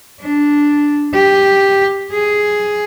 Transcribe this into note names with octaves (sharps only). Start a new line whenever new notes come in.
D4
G4
G#4